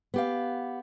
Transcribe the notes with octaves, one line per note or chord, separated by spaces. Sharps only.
B3 G4 F5